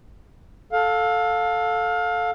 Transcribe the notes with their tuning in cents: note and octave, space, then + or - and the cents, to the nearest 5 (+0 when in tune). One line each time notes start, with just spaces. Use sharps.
A4 +0 F5 +25